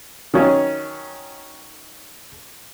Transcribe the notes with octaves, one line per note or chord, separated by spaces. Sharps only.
D#3 F#3 C#4